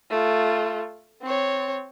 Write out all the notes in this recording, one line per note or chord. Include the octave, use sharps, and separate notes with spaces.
A3 F4
C4 C#5